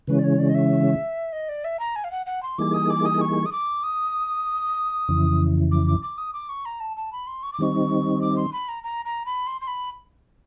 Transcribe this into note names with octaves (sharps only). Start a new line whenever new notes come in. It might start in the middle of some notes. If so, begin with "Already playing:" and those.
C#3 E3 G#3 C#4 B4
D5
C#5
D5
D#5
E5
D#5
D5
E5
A#5
G#5
F5
F#5
F#5
C6
E3 G3 A#3 D#4 G#4 D6
D#6
D6
D#6
C#6
D#6
D6
D#6
F2 C#3 E3
D6
D6
D6
D#6
D6
C#6
A#5
A5
A5
B5
C6
C#6
D6
D#3 G3 C4 D#4 C#6
D6
C6
B5
A#5
A#5
A#5
B5
C6
C6
B5